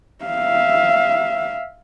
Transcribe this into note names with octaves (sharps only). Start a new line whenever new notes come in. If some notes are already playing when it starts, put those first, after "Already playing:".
E5 F5